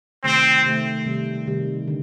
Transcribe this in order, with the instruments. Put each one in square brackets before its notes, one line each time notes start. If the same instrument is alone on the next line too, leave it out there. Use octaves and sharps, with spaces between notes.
[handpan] C3 D#3 A3 [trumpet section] C4
[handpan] C3 D#3 A3
C3 D#3 G3
C3 D#3 G3
D3